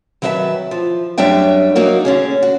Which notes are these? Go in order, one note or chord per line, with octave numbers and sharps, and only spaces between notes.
D#3 F#3 B4 E5 F5 A5
F3
F#2 F#3 G3 D4 E5 G5
F#3 A#3 D#4 F#4 A#4
D3 C#4 G#4
F#4